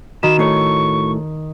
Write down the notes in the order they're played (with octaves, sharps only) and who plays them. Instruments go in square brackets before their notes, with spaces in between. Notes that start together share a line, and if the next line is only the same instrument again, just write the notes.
[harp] D#3 [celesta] F#4 [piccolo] E7
[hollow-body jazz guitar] A2 A3 C#5 [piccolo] C#6